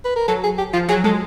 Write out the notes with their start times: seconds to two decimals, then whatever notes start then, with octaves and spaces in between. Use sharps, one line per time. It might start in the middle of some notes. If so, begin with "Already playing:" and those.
0.05 B4
0.16 A#4
0.28 F#3 A4
0.44 G#4
0.58 G4
0.73 F3 F4
0.88 F#3 G#4
1.04 G#3 A4